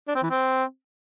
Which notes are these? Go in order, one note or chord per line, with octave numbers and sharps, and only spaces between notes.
D4
C4
E3
C4